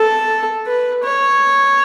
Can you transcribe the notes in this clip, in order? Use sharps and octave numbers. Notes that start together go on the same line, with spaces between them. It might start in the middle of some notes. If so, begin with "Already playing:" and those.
Already playing: A4
B4
C#5